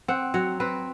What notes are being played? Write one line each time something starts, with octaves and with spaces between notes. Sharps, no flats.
C4 F#5
F#3 F#5
C4 B4